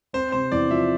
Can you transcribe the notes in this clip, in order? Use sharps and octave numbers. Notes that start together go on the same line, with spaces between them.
C4 C5
C3 C5
E2 D5
F3 E5